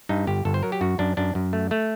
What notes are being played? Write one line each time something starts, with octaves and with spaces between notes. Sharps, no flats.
G2 D#4
G1 G4
G1 A4
C5
F#3 A#4
G4
F#2 F#4
F#2 D4
F#2 D4
F#2
A3
A3